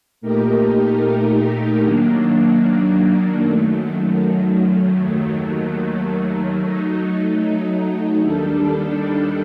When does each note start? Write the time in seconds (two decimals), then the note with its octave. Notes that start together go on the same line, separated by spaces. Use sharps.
0.21 A#2 A3 D#4 G4 A#4
1.81 D#3 F#3 A#3 D4
3.41 F#2 D#3 F#3 A3
5.01 D#2 D#3 F#3 A3
6.60 F#3 A3 D#4
8.20 D#2 D#3 G3 D4 A4